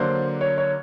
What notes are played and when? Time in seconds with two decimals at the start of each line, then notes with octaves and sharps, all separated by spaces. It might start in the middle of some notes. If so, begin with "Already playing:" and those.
Already playing: D3 F#3 A#3 D4 C5
0.41 C#5
0.58 C#5